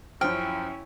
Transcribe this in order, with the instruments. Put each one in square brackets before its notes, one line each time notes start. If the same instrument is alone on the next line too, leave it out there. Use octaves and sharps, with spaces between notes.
[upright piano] F#2 F3 [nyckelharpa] C#4 E4 [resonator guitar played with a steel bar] G5 [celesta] F6